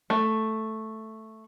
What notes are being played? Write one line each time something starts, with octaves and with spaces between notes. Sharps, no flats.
A3